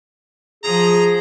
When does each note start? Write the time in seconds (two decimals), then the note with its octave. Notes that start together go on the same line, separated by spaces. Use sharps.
0.64 F3 G#4 A#5